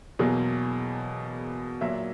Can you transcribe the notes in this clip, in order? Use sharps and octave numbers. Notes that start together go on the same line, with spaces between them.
E2 B2 F#3 A#3 G#4
A#2 F#3 A#3 E5